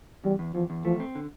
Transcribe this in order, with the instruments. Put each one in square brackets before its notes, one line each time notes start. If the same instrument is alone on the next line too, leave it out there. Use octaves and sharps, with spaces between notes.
[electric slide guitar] E2 [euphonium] G3
[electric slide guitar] E2
[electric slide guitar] E2 [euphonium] F3
[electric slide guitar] E2
[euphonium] F3 [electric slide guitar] A3
[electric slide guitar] C4
D3